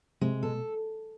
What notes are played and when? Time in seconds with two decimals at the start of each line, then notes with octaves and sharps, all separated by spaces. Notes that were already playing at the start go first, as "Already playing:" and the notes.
0.21 C3 G#3
0.43 B2 A4